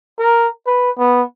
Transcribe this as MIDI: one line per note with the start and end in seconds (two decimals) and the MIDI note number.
0.19 0.48 70
0.67 0.91 71
0.98 1.23 59